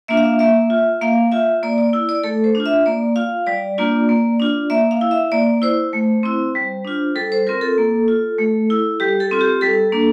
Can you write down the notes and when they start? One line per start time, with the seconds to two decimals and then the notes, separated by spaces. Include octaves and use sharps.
0.08 A#3 D4 F4 E5
0.17 F5
0.25 E5
0.39 A#3 E5
0.70 F4
1.01 A#3 F5
1.32 F4 E5
1.63 A#3 D5
1.78 D5
1.93 E4
2.09 D5
2.24 A3 A4
2.44 C5
2.55 D4 F4
2.66 E5
2.86 A#3 D5
3.16 F4 F5
3.47 G3 D5
3.78 A#3 D4 F4
4.09 A#3
4.40 D4 F4
4.70 A#3 E5
4.91 F5
5.01 E4
5.11 E5
5.32 A#3 D5
5.62 E4 C5
5.93 A3
6.23 C4 E4
6.55 G3
6.85 D4 F4
7.15 G3 A4
7.32 C5
7.47 C4 F4 A#4
7.61 A4
7.78 A#3
8.08 F4
8.38 A3
8.70 E4
9.00 G3 G4
9.20 A4
9.31 C4 F4
9.41 G4
9.61 G3 A4
9.92 A#3 D4